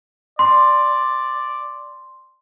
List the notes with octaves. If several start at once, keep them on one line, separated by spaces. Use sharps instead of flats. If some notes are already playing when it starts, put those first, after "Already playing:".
D5 C6